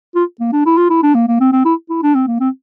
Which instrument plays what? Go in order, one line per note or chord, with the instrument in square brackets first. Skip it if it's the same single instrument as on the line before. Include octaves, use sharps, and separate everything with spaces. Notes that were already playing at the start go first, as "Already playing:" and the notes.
[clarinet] F4
A#3
D4
E4
F4
E4
D4
A#3
A#3
C4
C4
E4
E4
D4
C4
A#3
C4